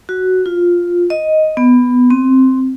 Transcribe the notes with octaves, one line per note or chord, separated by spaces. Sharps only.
F#4
F4
D#5
B3
C4